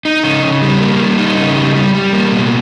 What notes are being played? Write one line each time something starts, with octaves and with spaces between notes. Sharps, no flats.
D#4
C#3
C#3
G3
A#3
G3
D#4
C#3
G3
G3
G3
A#3
B2